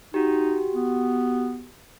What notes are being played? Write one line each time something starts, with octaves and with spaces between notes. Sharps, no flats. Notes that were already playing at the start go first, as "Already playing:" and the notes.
D#4 F#4 G4
B3